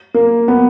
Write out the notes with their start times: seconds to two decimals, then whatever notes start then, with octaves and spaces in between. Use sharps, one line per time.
0.14 A#3
0.48 B3